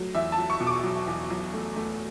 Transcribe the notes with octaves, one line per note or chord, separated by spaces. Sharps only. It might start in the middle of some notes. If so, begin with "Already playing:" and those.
Already playing: F#3 A3
E2 E5
A5
F#3
C#6
B2
D6
F#3
E2
F#3
A3
A3